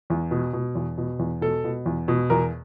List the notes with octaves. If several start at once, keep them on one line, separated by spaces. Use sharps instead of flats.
E2
B2
B2
E2
B2
E2
B2 A4
B2
E2
B2
E2 A#4